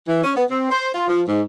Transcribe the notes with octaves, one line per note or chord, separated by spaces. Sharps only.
E3
C#4
B3
C4
C5
F4
F3
G#2